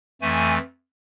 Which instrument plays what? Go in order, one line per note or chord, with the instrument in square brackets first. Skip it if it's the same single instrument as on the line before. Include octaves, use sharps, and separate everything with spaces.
[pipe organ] F2 E3 A3 G#5